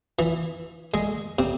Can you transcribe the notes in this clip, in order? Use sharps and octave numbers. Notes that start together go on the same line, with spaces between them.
E3
G#3
C3